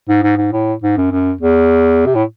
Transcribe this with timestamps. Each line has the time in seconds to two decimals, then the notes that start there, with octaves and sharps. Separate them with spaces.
0.09 G#2
0.23 G#2
0.37 G#2
0.53 A2
0.83 G#2
0.97 F#2
1.12 F#2
1.41 E2
2.06 C3
2.15 A2